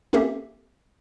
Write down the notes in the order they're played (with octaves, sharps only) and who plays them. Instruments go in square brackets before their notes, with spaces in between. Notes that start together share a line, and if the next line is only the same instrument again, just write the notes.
[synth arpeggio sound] A#3 C4 C#4 G4 A4 E5